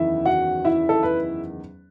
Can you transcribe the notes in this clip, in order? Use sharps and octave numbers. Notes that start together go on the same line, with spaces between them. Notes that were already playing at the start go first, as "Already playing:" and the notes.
Already playing: F#1 E2 D#3 E4 E5
F#4 F#5
E4 E5
A4
B4